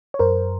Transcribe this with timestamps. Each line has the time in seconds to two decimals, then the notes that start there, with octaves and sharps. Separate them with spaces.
0.14 C#5
0.19 F#2 A#4 C5